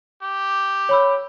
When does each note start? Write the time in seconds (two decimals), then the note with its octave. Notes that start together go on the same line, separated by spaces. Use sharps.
0.23 G4
0.89 C#5 B5 E6